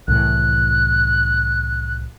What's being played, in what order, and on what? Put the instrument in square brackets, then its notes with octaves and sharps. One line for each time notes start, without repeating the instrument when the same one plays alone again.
[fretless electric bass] C2 A2 E3 [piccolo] F#6